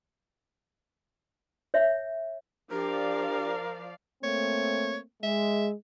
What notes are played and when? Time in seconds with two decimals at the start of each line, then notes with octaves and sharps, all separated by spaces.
1.74 C#5 E5
2.72 F3 D4 G4 A#4 D5 F5
4.24 A3 A#3 C4 C#5
5.23 G#3 E5